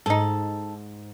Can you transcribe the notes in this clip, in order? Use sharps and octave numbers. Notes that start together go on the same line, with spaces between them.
G#2 D#4 A4